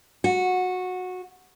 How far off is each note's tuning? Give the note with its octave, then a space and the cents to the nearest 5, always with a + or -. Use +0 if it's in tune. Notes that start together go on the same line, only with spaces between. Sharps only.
F#4 -15